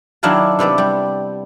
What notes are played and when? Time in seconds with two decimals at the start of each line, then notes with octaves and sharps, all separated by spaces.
0.23 D#3 F#3 D4 E4 F5 A5
0.59 C3 B3 D5 E5
0.78 G3